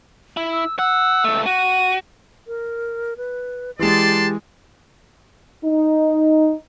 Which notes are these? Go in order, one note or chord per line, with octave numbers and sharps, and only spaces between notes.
E4
E6
F#5 E6
C#2 A3
F#4 D#7
A#4
B4
E3 G#3 G4 D5 A5 C6
D#4